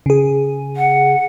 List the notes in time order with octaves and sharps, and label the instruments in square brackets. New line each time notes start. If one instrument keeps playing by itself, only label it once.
[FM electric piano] C#3 G#4
[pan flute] F#5